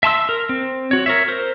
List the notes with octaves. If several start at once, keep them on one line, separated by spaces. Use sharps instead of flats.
E5 A5 C6 E6
A#4
C4
F#4 C#5
A#4 C#5 E5
A#4 C5